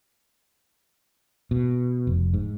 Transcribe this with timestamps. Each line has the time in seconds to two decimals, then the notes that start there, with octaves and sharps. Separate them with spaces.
1.51 B2
2.07 F1
2.34 G#2